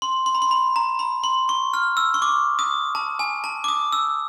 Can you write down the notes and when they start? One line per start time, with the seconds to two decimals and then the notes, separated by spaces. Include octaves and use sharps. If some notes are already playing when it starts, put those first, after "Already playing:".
0.02 C6
0.26 C6
0.35 B5
0.42 C6
0.51 B5
0.76 A#5
0.99 B5
1.24 C6
1.49 C#6
1.74 F6
1.97 E6
2.14 C#6
2.22 D6
2.59 D#6
2.95 A5
3.19 G#5
3.44 A5
3.64 D6
3.68 D#6
3.93 E6